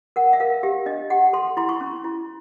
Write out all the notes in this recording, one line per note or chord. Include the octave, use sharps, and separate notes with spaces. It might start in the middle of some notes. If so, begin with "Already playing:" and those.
A#4 F#5
E5
A#4 F5
G4 E5
D4 D#5
G4 F#5
A4 C6
E4 C6
C#6
C#4
E4